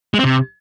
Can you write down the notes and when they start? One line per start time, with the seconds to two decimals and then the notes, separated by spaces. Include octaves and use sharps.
0.14 G#3
0.19 C4
0.24 C3